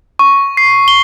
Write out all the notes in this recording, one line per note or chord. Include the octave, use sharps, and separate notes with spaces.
C#6
C7
G7